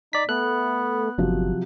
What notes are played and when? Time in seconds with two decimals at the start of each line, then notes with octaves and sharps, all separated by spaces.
0.13 D#4 D5 B6
0.29 A3 B3 F#6
1.18 G1 C3 F3 F#3